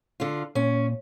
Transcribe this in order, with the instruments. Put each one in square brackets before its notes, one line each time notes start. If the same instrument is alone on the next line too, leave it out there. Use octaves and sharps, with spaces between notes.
[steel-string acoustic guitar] D3 F4
[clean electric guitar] A#2 [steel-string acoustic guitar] C#4